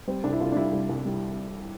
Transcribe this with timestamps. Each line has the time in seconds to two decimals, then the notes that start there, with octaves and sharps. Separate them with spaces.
0.08 G3 C4
0.24 C2 D4
0.33 E4
0.40 C2 F4
0.52 D4
0.56 G3 E4
0.73 C2
0.89 C2
1.05 G3